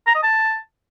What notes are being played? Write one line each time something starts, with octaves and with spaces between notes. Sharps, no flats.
A#5
D#5
A5